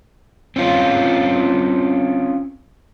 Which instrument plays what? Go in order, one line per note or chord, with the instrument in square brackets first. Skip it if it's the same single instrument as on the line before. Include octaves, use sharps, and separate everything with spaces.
[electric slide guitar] C4 C#4 F4